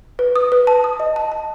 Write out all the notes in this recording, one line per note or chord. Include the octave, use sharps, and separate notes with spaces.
B4
D#6
B4
A5
D#6
D#5
A5
A5